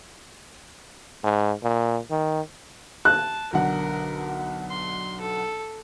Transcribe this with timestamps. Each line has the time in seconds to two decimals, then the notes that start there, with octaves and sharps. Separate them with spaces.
1.24 G#2
1.63 A#2
2.11 D#3
3.05 A5 F#6
3.53 B1 D3 A#4 F#5
4.70 C6
5.21 A4